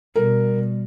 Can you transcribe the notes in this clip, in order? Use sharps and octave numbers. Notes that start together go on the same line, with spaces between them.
B2 G3 A#4